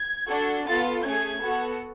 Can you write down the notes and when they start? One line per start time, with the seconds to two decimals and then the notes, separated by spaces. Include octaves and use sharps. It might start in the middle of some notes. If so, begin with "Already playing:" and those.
Already playing: G#6
0.29 D4 F#4 A4
0.66 B3 F4 A4 A6
1.04 A3 C#4 G#4 G#6
1.42 B3 F#4 A4